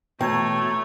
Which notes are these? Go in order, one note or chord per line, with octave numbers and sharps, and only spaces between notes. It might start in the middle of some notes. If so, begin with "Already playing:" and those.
B2 E3 A3 C#5 G5 A#5 G#6